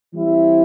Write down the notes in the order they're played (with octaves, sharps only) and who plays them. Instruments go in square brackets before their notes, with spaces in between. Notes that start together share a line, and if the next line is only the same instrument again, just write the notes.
[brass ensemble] E3 G3 C4 E4